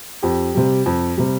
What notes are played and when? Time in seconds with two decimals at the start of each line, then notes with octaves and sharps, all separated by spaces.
0.22 F2 G4
0.55 C3 G3
0.86 F2
1.17 C3 G3